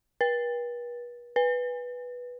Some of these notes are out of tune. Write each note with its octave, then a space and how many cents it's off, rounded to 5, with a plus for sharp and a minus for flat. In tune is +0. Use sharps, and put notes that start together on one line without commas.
B4 -40
B4 -5